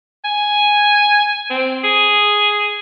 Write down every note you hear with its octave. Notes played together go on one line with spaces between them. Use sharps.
G#5
C4
G#4